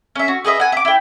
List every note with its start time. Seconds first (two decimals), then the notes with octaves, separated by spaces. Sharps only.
0.15 C#4 E5
0.28 F#4
0.45 G#4 B4 D#5 E5
0.60 F#5 G#5
0.72 E5 D6
0.85 E4 G5